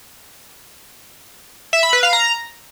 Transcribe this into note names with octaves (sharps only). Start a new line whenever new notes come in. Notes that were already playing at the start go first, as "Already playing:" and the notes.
E5
B5
B4
F5
A#5